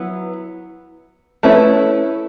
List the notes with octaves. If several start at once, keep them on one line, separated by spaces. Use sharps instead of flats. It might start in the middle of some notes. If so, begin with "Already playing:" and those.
Already playing: F#3 B3 E4 B4
A3 C#4 E4 B4